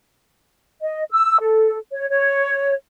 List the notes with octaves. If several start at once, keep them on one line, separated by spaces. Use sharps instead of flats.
D#5
E6
A4
C#5
C#5